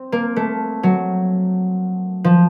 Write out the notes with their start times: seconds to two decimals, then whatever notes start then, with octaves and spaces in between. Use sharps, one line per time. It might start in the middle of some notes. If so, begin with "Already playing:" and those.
Already playing: C4
0.12 A#3
0.36 A3
0.83 F#3
2.24 F3